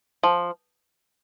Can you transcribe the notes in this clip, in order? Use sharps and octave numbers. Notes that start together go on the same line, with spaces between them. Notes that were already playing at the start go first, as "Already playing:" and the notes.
F3